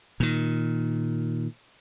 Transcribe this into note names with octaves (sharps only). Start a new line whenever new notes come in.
A#2 D#3